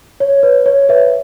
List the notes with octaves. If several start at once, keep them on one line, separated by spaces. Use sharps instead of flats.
C#5
B4
C#5
B4 E5